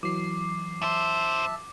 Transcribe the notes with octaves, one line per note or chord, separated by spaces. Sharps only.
E3 F#3 D6 C7
F#2 C5 E5 A5